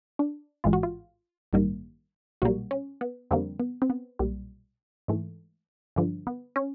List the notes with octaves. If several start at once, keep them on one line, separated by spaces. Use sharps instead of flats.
D4
A1 G#2 E3 G#3 F4
F#4
F4
A1 G2 D#3 G3 A#3
B1 A#2 G3 A#3 F#4
C#4
B3
F2 D3 G3 A#3 C4
B3
C4
B3
B1 A#2 G3
G#2 E3 A3
G2 D3 F3
B3
C#4